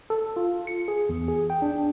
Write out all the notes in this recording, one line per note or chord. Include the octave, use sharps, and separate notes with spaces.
A4
F4
C#7
G#4
E2
G#4
G5
D4